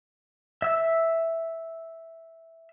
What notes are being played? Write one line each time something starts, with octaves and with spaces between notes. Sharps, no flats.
E5 E6